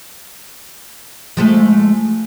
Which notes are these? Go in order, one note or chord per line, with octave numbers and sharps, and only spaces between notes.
F3 G#3 A3